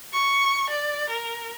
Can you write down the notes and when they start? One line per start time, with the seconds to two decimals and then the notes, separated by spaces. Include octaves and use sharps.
0.13 C#6
0.70 D5
1.10 A#4